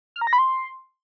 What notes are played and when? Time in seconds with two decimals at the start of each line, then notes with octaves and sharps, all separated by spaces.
0.16 F6
0.21 A#5
0.27 A#6
0.33 B5
0.38 C6